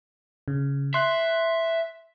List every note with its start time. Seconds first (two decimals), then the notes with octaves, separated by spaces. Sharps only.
0.48 C#3
0.94 E5 C6 F#6